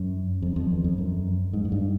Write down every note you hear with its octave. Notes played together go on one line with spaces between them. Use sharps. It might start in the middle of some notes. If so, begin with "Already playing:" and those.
Already playing: F#2
F2
F2
E2
F2
F#2
G#2
G#2
G2